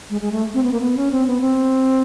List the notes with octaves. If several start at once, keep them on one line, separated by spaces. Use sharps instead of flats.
G#3
G#3
A3
C4
B3
A#3
B3
C#4
C4
B3
C4